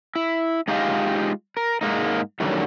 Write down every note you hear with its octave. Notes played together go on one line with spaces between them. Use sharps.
E4
G#3 D#4 F4 G4 D#5 F5
A#4
G#2 G#3 A#3 D#4
F#2 A2 D3 D#3 F#3 G3